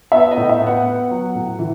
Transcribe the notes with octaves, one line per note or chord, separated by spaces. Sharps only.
B3 E5
D#5
A2
E5
B3 F#5
B3
F#3
A2
E3